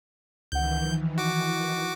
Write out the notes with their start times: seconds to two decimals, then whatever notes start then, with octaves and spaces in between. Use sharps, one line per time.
0.52 C#2 D#3 E3 F#5 G6
0.85 F3
1.18 F#4 D6